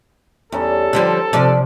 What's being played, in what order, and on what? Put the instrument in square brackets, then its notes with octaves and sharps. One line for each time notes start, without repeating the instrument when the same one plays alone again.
[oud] E2 [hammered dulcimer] G3 C#4 D#4 [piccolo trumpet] A4
[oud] D3 F3 G3 [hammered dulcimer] C5
[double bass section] C3 [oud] F3 D4 D5